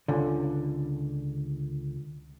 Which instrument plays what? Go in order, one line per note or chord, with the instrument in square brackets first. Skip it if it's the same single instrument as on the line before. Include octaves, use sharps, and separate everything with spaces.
[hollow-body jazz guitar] C#2 D3